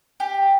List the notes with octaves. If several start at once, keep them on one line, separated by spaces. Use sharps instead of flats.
G4